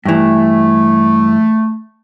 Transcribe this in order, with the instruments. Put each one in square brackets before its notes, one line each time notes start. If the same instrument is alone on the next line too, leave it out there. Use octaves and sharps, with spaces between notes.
[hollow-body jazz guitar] G2 E3 [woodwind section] A3